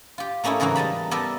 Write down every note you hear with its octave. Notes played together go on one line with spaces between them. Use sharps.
F4 G4
A3 A#3 C#4 D#4 E4
G#2 C#3 E3 F#3 A#3
G3 D#5 A5 B5
B3 G4 A#4 D5 E5 A5